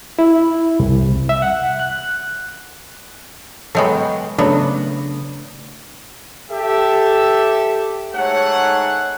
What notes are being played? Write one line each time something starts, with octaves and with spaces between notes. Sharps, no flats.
E4
C2
E5
F#5
F#6
F#3 G#3 B3 A4 G5 C#6
C#3 F#3 A3 B3 D4
G4 A4 E5
G#2 A3 C#5 F#5